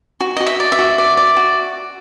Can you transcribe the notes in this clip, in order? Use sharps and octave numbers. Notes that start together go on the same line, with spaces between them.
F#4
F#4 D#5
E5
D5
E5
F#4
D5
D5
F#4